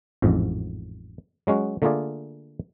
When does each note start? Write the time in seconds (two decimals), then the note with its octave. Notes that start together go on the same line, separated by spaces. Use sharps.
0.22 A1 F2 G#2
1.47 F#3 G#3 C#4 F#4
1.82 D3 A3 A#3 F4 G#4 D5